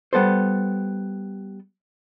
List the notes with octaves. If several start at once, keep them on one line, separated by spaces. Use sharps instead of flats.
G3 B3 A4 C5